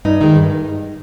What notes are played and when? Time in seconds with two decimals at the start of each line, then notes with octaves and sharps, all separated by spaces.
0.05 G2 D#4
0.21 D#3 G#3
0.36 G2